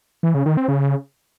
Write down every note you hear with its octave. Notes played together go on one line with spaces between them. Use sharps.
E3
C#3
D#3
C4
C#3